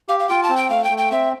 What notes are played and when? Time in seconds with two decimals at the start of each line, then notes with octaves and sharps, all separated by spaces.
0.09 G4 F5
0.19 F5
0.29 F4 G5
0.43 A5
0.49 C4
0.57 G5
0.70 A3 F5
0.84 G5
0.90 A3
0.98 G5
1.11 C4 E5